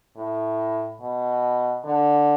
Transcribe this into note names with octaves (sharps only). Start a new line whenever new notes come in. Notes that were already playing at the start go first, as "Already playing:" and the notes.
A2
B2
D3